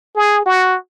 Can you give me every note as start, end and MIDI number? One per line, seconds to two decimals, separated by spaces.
0.16 0.42 68
0.46 0.76 66